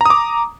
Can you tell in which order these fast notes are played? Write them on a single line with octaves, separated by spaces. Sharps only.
A#5 D#6 D6